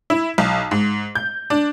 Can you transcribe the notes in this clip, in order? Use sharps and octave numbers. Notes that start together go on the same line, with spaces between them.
E4
B1
G#2
G6
D4